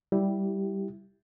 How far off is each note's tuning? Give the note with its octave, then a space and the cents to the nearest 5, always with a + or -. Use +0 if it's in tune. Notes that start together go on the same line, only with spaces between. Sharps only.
G3 -5 E4 +0 G4 +0